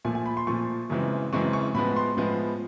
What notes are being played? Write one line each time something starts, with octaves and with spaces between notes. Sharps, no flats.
A#2 F3 A3 G#5
G#5
B5
C6
A#2 F3 A3 C#6
F#2 C#3 E3 G#3 C4
F#2 C#3 E3 G#3 C4 C#6
C#6
A2 F3 G#3 B3 B5
C6
A2 F3 G#3 B3